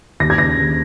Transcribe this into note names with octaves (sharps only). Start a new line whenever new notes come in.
D#2 A#6
G#6
C#3 A#6
D#2